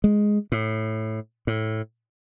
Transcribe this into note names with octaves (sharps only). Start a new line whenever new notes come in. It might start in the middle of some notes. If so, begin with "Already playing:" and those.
G#3
A2
A2